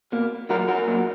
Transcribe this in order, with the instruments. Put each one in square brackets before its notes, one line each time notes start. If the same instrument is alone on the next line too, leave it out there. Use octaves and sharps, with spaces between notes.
[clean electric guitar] B2 A#3
A#2 F#3 A#3 F#4 A#4
F#4 A#4
A#2 F#3 A#3